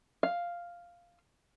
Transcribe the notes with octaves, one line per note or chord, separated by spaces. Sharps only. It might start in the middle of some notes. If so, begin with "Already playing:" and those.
F5